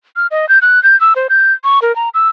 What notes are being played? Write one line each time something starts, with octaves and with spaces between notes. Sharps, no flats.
F6
D#5
G6
F#6
G6
E6
C5
G6
C#6
A#4
A#5
E6